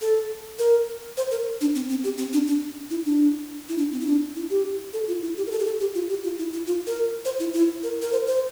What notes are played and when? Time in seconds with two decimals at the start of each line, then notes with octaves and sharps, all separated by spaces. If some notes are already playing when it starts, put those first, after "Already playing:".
0.01 A4
0.59 A#4
1.17 C5
1.31 A#4
1.61 D4
1.75 C4
1.89 C4
2.04 G4
2.18 C4
2.33 D4
2.47 D4
2.90 E4
3.05 D4
3.69 E4
3.78 D4
3.92 C4
4.01 E4
4.07 D4
4.36 E4
4.50 G4
4.93 A4
5.08 F4
5.22 E4
5.37 G4
5.47 A#4
5.51 A4
5.60 G4
5.66 A4
5.80 G4
5.95 F4
6.09 G4
6.24 F4
6.39 E4
6.53 E4
6.67 F4
6.87 A#4
7.25 C5
7.40 E4
7.54 E4
7.83 A#4
8.02 A#4
8.12 C5
8.27 C5